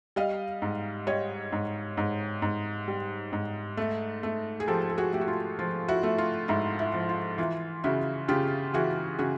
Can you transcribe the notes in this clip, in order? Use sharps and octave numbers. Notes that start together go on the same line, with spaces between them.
G3 D#5 F5
G#2
G3 C#5 D#5
G#2
G#2
G#2
G3
G#2
A3
A3
G#4
F3 G4 A4
A4
F#4 G#4
A3 G4
F#4
F4
F3 F4
E4 F#4
A3
F4
G#2 E4
E4
F3
F4
E3 F4
C#3 E4 F#4
C#3 F4 G4
E3 F#4 G#4
C#3 F#4 G#4